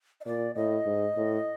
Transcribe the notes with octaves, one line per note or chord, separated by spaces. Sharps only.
D#5
A#2 D5
A2 D#5
G#2
A2